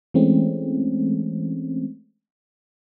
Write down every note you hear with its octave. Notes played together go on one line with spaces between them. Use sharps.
E3 G#3 A3 C4 C#4